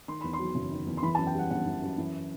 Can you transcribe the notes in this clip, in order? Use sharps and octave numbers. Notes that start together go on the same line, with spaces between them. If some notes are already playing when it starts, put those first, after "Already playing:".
D#3 C6
E2 B5
C6
F#3
F#1
D#3
E2
C6
E3 B5
A5
F#2
G5
G3 F#5
G1 F#5
E3
F#2
E3